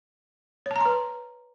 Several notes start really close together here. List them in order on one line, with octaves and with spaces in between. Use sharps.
C#5 A5 A#5 C6 B4